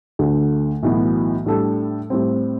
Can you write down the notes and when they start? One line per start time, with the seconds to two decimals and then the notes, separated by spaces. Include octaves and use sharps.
0.19 D2 D3 A3
0.83 B1 A2 E3 B3 F#4
1.46 A2 G3 D4 A4
2.10 A2 G3 C4